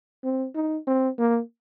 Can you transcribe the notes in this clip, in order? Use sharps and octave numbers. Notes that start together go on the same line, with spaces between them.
C4
D#4
C4
A#3